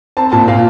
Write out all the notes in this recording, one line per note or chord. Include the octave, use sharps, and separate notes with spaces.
C4 A5
A#2 A5
A#2 F5